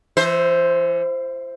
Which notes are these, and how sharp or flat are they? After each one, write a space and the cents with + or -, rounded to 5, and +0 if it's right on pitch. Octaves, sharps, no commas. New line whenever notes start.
E3 +45 C5 +0 E5 +0